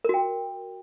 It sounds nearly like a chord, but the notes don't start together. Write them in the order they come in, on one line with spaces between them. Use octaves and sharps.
A#4 F#4 G5